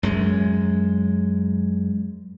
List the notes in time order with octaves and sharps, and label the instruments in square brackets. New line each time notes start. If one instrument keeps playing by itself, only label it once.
[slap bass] F#2 G#3